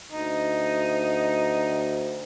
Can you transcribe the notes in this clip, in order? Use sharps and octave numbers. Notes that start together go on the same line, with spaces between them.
D2 D#4